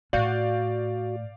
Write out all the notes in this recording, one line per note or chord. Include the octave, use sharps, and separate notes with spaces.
A2 F#4 D5 F5 G6